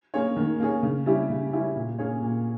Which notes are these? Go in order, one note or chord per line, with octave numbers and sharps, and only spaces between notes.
A#3 C#4 G#4 C#5
D#3
A#3 C#4 G#4 C#5
C#3
G3 C#4 E4 G4
C#3
G3 C#4 E4 G4
A#2
A#3 C#4 G#4 C#5
A#2